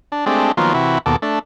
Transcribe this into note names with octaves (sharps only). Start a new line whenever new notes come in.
D4
G#3 A3 C4 D4 G4
D#3 F3 F#3 A#3 B3 F4
C3 E3 E4 F#4
D#2 B2 A4 D6
A3 D4